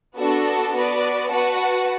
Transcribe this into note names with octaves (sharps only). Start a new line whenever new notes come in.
B3 D4 F#4 A4
B3 F#4 B4 D5
F#4 B4 F#5 A5